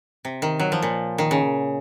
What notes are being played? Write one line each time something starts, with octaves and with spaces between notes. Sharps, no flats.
C3
D#3
F#3
F3
A#2
D#3
C#3